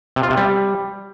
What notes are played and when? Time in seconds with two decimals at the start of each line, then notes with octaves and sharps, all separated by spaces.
0.16 C3
0.23 F4
0.30 C3
0.37 G3